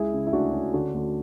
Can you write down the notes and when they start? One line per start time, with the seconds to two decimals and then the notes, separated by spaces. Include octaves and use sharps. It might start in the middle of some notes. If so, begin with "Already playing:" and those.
Already playing: C#2 G#3 E4 G#4
0.13 C#3
0.27 E4
0.33 D2 D4 F#4
0.53 C#4
0.73 D3 D4 F#4
0.94 D2